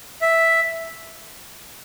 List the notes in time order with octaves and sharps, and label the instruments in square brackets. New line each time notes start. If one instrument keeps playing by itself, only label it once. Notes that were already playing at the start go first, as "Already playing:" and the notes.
[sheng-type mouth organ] E5